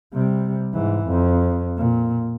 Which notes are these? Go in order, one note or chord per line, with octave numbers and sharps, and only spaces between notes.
C3 G3
G#2 E3
F2
A#2